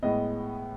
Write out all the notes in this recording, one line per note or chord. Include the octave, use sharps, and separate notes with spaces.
A2 G#3 B3 D#5